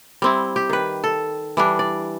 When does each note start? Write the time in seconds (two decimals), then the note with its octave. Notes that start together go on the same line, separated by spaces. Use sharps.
0.22 G3 C4 E4
0.56 G4
0.70 D#3 B4
1.04 A4
1.57 E3 G3 D4
1.79 D5